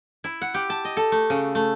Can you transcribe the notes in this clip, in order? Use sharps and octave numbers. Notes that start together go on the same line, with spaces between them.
E4
F#5
G4
A5
D#5
A4
A3
C#3
A3